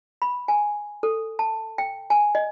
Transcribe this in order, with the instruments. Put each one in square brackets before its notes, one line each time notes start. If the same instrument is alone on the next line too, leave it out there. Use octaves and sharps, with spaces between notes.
[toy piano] B5
G#5
A4
A5
G5
G#5
D#5